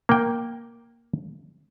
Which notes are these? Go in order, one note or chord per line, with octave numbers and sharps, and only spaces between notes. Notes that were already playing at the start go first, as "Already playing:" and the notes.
A#3 G5